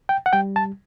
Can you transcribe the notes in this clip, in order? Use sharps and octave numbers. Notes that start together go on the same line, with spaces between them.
G5
F#5
G3 G5
A5